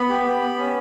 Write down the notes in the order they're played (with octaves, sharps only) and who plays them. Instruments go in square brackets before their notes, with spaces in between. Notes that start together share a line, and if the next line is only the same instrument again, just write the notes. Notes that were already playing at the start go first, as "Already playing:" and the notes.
Already playing: [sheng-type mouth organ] B3 B5
G4
G4
B3
C#4